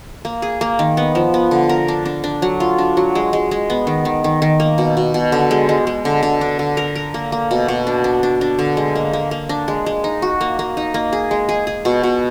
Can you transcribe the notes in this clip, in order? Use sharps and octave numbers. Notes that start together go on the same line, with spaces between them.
A#3
G#4
A#3
D#3
B3
F3
B3
D3
A#4
D4
D4
D4
F#3
F4
D4
F#3
G#3
G#3
G#3
B3
D#3
D#3
D#3
D#3
A#3
B2
B2
B2
D3
G#3
G#3
G#3
D3
D3
D4
D3
A#4
A#4
A#3
A#3
B2
B2
D4
D4
D4
D4
D3
G#3
A#3
A#3
A#3
D4
G#3
G#3
D#4
F#4
A#3
A#3
D#4
A#3
G#4
G#3
G#4
G#4
B2
B2